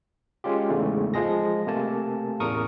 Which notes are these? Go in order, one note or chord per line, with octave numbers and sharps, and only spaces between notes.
G#3 C#4 F4 G4
E2 G#2 C#3 A3
F3 G#3 G#4 A#6
C3 A3 A#3 G#5 A5
A1 E2 A#4 C#6 D#6